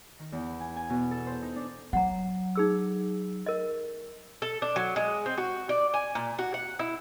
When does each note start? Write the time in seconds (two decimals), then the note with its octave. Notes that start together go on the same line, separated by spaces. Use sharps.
0.19 D#3
0.32 E2
0.60 G#5
0.76 G#5
0.90 B2
1.11 A4
1.27 C5
1.42 D#4
1.56 D4
1.93 F#3 F#5 A#5
2.56 D#4 G#4 E6
3.46 A#4 D#5
4.42 A4
4.62 D4
4.76 F#3
4.96 G#3
5.26 C4
5.38 F#4
5.69 D5
5.94 G#5
6.15 A#2
6.38 F#4
6.54 F#5
6.79 E4